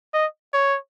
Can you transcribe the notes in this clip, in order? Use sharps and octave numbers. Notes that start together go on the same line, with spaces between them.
D#5
C#5